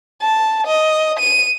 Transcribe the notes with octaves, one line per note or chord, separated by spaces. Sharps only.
A5
D#5
D#7